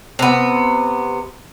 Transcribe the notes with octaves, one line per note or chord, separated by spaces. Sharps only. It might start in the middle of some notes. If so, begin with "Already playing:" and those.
C3 B3